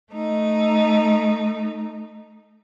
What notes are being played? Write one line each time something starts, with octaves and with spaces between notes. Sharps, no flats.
A3 D#4